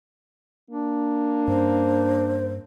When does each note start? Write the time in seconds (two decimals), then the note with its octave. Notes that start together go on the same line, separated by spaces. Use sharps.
0.70 A#3 D4
1.48 G2 C#4 C5